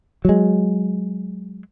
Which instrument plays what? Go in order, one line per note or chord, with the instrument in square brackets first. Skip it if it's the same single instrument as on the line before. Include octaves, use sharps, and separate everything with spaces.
[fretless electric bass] F#3 G#3